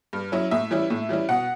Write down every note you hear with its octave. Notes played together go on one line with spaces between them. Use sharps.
G2
F#3 C#4 E4
A2 E5
E3 G3 C#4 E4
A2
E3 G3 C#4 E4
B2 F#5